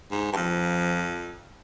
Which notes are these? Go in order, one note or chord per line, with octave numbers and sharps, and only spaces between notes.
G#2
G2
F2 F3